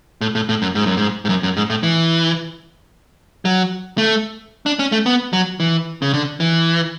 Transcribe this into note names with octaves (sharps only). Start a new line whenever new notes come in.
A2
A2
A2
F#2
G#2
F#2
G#2
G#2
F#2
F#2
G#2
A2
E3
F#3
A3
D4
C#4
A3
B3
F#3
E3
C#3
D3
E3